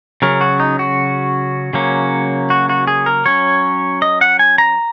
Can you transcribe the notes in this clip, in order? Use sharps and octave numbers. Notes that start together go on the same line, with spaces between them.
C#3 F#3 C#4 A#4
F#4
D#4
F#4
C#3 F#3 A#3 C#4
F#4
F#4
G#4
A#4
F#3 C#4 C#5
D#5
F#5
G#5
A#5